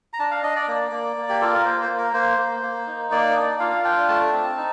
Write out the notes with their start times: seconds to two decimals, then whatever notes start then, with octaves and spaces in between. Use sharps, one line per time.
0.13 A#5
0.19 D4 A5
0.31 F5
0.43 D4 D#5
0.56 D5
0.68 A#3
0.91 A#3
1.16 A#3
1.29 G4
1.41 F4 A4
1.53 A#4
1.65 A#3 C5
1.81 C5
1.89 A#3
1.98 A#4
2.13 A#3 C5
2.38 A#3
2.63 A#3
2.87 D#4
3.11 A#3 D5
3.36 D4
3.59 F4 F5
3.84 D4 G5
4.08 A3 A5
4.32 C4
4.57 D#4